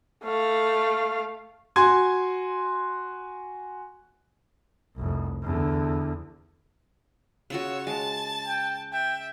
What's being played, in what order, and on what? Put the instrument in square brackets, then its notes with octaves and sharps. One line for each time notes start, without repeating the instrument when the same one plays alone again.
[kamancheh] A3 F5
[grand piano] F#4 G#5 C6 G#6
[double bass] F1 C2
E2 D3
[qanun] C#3 F4 F#4 [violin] C#5 E6
[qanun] G#3 [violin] A5 A6
[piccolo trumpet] G5
[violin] E5 [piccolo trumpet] G5